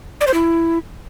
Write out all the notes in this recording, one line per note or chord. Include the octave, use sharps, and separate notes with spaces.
D5
C5
E4